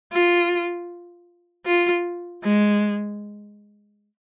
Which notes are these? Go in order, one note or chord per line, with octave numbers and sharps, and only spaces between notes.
F4
F4
G#3